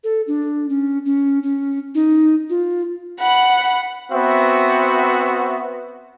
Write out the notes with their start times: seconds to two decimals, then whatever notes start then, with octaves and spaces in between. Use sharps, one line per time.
0.04 A4
0.27 D4
0.69 C#4
1.05 C#4
1.43 C#4
1.95 D#4
2.50 F4
3.21 F#5 B5
4.12 B3 C4 F#4 B4 E5